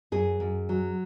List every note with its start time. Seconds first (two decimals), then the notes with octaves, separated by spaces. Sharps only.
0.12 F#2 G#4
0.40 F#2
0.69 F#3